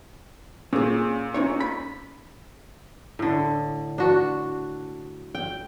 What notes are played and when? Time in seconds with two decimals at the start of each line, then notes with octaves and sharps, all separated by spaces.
0.73 A#2 C#4 G#4
1.34 C#4 D#4 C#5
1.60 B5
3.19 A2 D3
3.98 D4 F#4
5.35 G5